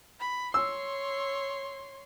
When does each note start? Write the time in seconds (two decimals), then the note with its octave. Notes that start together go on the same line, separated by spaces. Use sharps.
0.20 B5
0.54 C#5 C6 E6